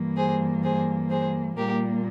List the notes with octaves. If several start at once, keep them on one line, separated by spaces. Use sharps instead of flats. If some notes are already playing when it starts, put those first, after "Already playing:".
Already playing: G2 E3 A#3
G#4 C5
G#4 C5
G#4 C5
A#2 G3 A#3 G4 A#4